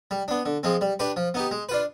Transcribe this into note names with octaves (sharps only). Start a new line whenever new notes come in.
G3
B3 D4
D3
F3 G#3 C4
G3
D4 G4 B4
F3
B3 D#4 G4
G#3
D4 F4 B4